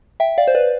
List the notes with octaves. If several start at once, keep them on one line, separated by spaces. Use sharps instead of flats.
E5 G5
D5 F5
C5
B4 D5